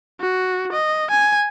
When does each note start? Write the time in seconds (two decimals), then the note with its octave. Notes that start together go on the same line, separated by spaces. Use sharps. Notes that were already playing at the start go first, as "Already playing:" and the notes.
0.20 F#4
0.72 D#5
1.11 G#5